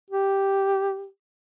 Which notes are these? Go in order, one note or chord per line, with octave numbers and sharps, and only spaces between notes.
G4